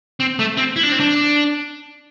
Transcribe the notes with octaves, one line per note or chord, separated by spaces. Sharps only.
C4
A3
C4
E4
D4
C4
D4